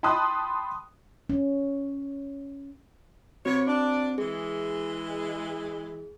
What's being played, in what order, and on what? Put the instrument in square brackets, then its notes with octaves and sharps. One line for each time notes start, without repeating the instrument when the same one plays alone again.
[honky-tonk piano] G5 A5 B5 C6 D#6 F#6
[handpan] C#4
[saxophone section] C3 B4 C#5 [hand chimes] C4 F#4
[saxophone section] D4
[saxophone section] E3 G#3 [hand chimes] G#4